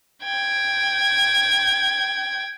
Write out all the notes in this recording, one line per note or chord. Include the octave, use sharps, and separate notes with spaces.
G5 G#6